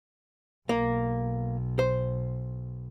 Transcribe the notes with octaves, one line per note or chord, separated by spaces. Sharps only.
B1 A#3
C5